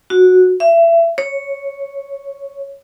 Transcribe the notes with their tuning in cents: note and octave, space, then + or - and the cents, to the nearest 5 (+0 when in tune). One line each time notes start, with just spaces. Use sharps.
F#4 -10
E5 +30
C#5 +0